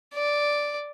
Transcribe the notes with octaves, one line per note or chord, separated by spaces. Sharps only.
D5